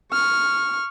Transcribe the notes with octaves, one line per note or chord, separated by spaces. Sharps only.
C#6 F6